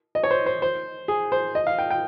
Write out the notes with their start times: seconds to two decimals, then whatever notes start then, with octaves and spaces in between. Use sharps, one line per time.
0.15 D#5
0.23 C#5
0.31 C5
0.46 C5
0.62 C5
1.08 G#4
1.32 C5
1.55 D#5
1.67 F5
1.79 G5
1.90 G5